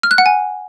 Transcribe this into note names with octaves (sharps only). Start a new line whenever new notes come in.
F6
F#6
F#5
G#5